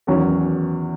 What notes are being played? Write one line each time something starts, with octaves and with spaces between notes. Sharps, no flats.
E2 D#3 F#3 C#4